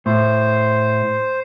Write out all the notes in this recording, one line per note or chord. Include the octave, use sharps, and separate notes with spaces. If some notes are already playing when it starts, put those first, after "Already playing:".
A2 C5